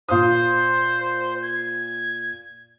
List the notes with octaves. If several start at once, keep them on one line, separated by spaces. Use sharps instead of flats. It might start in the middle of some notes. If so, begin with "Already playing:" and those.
A#2 C5 F5 D#6
G#6